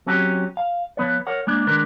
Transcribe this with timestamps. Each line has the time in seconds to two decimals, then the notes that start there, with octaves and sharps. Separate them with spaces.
0.06 F#3 C4 C#4 F#4 G4
0.57 F5
0.97 F3 B3 B4 C#5
1.27 A#4 C#5 F#5
1.47 G#3 A#3 D4
1.67 D#3 G#3 D4 A#4 B4